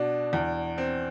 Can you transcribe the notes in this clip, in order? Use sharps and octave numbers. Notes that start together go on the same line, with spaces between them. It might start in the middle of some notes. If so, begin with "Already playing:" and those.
Already playing: B2 D4 F#4
E2
C4